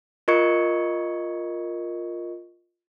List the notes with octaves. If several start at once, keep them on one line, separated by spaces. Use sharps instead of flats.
F4 A#4 D#5 C#6 G#6 C#7